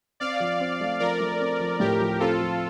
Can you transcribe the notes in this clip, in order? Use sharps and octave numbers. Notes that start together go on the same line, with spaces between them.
C4 D5 F5
F3
C4
A3
F3 A#4 D5
A3
C4
F3
A2 G4 A#4
F3
C4 F4 A4
F3